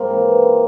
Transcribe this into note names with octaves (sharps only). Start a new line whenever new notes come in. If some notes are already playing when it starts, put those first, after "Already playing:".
Already playing: G#2 A#3 C4
E3